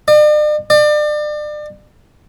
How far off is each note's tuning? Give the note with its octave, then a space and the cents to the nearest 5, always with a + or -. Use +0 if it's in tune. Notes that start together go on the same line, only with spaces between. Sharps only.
D5 +45
D5 +35